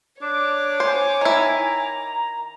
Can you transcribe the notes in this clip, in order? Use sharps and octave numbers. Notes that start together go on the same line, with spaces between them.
D4 C#5 D6
C5 G#5
D#3 E4 A#5